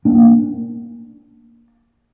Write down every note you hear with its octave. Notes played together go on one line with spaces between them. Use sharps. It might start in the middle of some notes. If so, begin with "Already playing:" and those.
A#3 D4